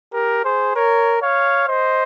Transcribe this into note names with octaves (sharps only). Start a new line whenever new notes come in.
G4 A#4
G#4 C5
A#4 C#5
C#5 F5
C5 D#5